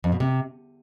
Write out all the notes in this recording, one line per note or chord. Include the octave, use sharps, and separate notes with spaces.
F2
B2
C3